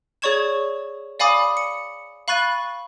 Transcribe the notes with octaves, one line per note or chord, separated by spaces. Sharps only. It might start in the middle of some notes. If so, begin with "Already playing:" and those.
G#4 C#5 D5 C#6 G#6 E7
D5 F5 G#5 B5 D6 D#6
C#7
F5 B5 C#6 F#6 A6 D#7